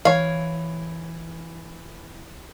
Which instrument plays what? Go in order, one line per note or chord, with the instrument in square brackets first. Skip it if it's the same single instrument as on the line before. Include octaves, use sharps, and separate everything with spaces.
[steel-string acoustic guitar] E3 [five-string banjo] C#5 F5